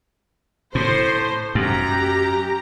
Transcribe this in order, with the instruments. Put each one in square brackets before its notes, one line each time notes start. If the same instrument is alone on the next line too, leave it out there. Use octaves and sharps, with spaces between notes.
[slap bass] A2 [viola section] C5 C6
[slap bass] F#2 [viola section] G4 A#5